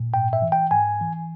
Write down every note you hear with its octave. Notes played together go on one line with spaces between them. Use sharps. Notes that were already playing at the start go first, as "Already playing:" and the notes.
Already playing: A#2
G#2 G5
E5
E3
G5
G#2 G#5
E3